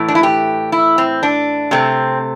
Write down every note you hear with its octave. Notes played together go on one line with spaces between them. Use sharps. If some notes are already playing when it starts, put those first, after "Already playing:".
Already playing: A2 E3 A3
D4
E4
G4
E4
C4
D4
C3 A3 C4